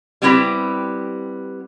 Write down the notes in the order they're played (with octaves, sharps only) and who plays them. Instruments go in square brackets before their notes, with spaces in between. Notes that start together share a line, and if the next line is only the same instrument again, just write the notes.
[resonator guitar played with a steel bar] G3 B3 C4 E4 F#4 G4